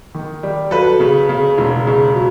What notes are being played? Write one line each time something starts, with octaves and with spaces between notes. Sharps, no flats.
D#3
G3
F#3 A4 B4
C#3
C#3
E1
C#3
F#3